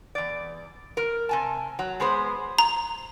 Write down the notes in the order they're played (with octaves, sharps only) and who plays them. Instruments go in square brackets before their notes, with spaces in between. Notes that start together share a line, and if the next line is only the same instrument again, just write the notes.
[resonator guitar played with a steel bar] E2 D5
A#4
C3 G#5 A5
F#3
G#3 B3 G#4 C5
[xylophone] A#5